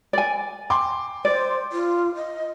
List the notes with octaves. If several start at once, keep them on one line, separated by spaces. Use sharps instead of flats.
D5 G#5
G5 C6 D6
C5 D5
F4
D#5